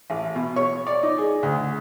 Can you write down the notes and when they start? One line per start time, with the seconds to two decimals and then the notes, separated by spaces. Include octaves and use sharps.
0.10 A1
0.35 B2
0.56 C#5
0.87 D5
1.03 D#4
1.18 G#4
1.43 D2